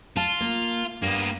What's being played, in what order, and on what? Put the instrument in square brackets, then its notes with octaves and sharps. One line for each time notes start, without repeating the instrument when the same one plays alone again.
[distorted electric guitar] F4 [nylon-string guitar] A5
[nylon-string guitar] A#3
[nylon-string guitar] G2 [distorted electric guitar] A#3 B3